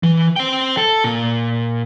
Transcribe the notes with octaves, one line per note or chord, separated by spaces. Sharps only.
E3
C5 G5
A4
A#2